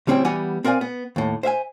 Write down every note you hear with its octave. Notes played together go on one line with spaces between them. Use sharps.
D2 G3 C4 C#4 E4 G5
E3 G3 B3 F#5 G#5
C4 A#4 D5 F5 G#5
B3
D#2 A2
C5 E5 F5 G#5